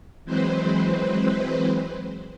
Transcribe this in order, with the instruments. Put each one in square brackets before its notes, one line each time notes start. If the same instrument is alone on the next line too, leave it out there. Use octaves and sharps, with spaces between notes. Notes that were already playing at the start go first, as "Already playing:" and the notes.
[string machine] E3 F#3 G#3 C4 B4 C5